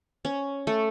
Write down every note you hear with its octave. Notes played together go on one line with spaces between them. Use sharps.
C#4
A3